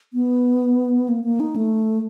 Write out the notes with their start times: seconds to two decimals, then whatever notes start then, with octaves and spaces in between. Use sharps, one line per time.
0.14 B3
1.09 A#3
1.24 A#3
1.40 D#4
1.56 A3